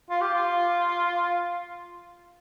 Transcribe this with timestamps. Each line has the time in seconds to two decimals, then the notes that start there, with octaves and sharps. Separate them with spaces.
0.10 F4
0.21 G4
0.34 F4